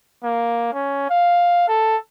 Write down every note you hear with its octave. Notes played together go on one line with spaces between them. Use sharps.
A#3
C#4
F5
A4